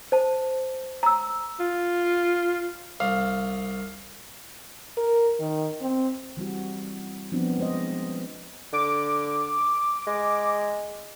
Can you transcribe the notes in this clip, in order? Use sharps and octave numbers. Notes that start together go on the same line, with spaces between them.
C5 A5
A#5 E6
F4
C2 F5
A#4
D#3
C4
E3 G3 C4 F#4
F3 B3 C4 D4
G#3 C5 D#5
D3 D6
G#3